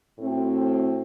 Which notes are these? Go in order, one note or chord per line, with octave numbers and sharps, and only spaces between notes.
A2 A3 C4 F#4